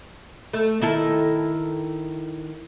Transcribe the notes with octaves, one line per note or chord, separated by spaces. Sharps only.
A3
D#3 E4 A4